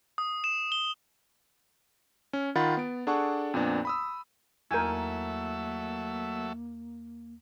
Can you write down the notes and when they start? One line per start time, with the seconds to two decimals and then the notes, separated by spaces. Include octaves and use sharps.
0.18 D#6
0.44 E7
0.72 G7
2.33 C#4
2.55 D#3 F4 F#5 B5 A6
2.77 B3 D7
3.07 D4 G#4 A4 F#5 A5 C#6
3.54 F2 A#2 B3 D4
3.85 B5 D#6 E6
4.71 E2 F#3 A3 A#3 A#4 E5 G#5 G6